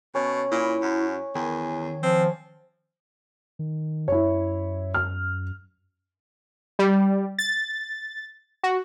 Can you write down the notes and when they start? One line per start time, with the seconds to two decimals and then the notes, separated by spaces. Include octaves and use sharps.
0.15 B2 C#4
0.52 A#2 E4
0.82 F#2
1.35 E2 D#3 G#5
2.03 F3 C4
3.59 D#3
4.08 F#2 E4 C#5
4.94 F6
6.79 G3
7.39 A6
8.63 F#4